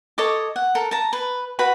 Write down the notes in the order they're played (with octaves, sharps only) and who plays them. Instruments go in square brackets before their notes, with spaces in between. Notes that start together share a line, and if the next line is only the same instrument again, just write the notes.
[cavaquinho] A4 C#5 D#5 D6
F#5
A4 A#4
A5 A#5
B4
F#4 B4 B5